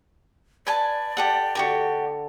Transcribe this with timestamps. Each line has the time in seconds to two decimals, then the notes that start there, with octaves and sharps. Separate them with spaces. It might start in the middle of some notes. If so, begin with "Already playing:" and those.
0.67 B4 D5 G#5 A5
1.17 G4 A4 F#5
1.55 D3 F#4 G4 A#4